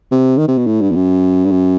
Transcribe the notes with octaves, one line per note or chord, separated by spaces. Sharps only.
C3
D#3
C3
B2
A2
G2
E2
F#2
G2
F#2